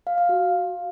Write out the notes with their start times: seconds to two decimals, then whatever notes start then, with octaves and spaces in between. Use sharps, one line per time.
0.07 F5
0.18 F5
0.29 F#4